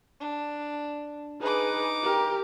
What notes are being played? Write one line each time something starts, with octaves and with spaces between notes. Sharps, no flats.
D4
D#4 G#4 B4 D6
G4 A#4